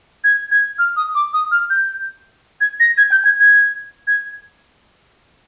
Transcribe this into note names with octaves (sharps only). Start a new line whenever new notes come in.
G#6
G#6
F6
D#6
D6
D#6
F6
G6
G#6
A#6
G#6
G6
G#6
G#6
G#6